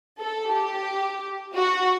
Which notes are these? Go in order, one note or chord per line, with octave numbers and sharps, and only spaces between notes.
A4
G4
F#4